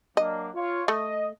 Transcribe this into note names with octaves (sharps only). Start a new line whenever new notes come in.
F#3 A#3 D4 D#5
F4 C#5
A3 D#5